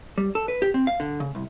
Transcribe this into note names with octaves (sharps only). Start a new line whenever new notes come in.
G3
A4
B4
G4
C4
F5
D3
C#3
C2